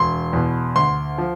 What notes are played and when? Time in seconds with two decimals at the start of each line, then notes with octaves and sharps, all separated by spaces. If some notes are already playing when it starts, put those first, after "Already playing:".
Already playing: E1 C6
0.33 E2 B2
0.76 D2 C6
1.18 F3